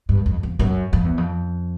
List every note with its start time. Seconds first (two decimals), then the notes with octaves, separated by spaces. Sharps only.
0.09 G2
0.26 F2
0.43 F2
0.59 F#2
0.93 F2
1.05 E2
1.18 F2